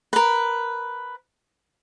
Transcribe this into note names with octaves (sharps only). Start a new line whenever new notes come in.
A#4 B4